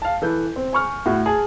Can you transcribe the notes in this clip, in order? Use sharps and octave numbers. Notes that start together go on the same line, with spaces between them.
F5 A5
E3 A4 B4 G6
C4
G#5 C#6 F6
A2 F#4
G#4 A5